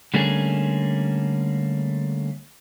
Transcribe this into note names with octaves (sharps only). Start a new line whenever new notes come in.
D3 G3 A3 A#3 C#4 G#4